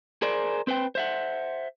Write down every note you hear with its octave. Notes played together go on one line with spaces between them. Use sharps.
G#4 A#4 C5 D5
C4 B4 C5 G5
C5 E5 F#5